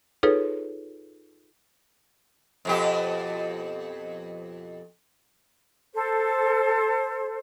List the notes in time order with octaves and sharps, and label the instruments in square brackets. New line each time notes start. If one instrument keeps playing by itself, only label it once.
[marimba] D#4 F4 G#4 A4 B4 C#5
[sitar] F2 B2 G4
[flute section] A4 C5